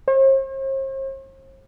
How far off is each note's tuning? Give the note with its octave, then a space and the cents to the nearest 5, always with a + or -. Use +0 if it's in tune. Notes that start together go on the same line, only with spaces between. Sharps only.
C5 +45